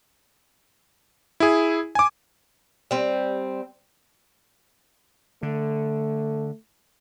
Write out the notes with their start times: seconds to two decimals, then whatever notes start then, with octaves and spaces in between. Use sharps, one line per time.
1.40 E4 G#4
1.95 G#5 D6
2.91 G3 C4
5.43 D3 A3